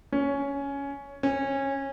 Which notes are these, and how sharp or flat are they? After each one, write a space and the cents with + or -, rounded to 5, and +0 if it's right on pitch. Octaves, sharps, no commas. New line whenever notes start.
C#4 +10
C#4 -20